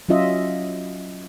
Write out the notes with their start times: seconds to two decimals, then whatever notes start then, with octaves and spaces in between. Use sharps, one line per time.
0.09 F#3 C#4 F4 D#5 E5